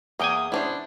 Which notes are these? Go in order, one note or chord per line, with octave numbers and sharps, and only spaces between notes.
E2 A#3 G5 G#5 D#6
C#4 D4 E4 C5